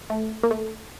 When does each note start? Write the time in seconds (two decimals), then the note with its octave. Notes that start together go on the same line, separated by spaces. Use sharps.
0.10 A3
0.43 A#3
0.51 A3